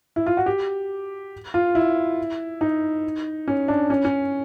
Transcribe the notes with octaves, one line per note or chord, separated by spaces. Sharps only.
E4
F4
F#4
G4
F4
E4
D#4
C#4
D4
C#4
C#4